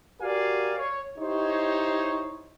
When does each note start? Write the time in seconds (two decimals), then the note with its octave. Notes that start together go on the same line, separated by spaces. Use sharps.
0.20 F#4 G4 A#4 D5 F5 G#5
0.78 C#5
1.18 D#4 E4 G4 C5 C#5